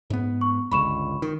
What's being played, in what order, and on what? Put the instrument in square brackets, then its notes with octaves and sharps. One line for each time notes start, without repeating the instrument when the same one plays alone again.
[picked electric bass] G#2 B3
[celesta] C#6
[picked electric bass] G1 C#2 [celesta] B5 C#6 E7
[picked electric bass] D#3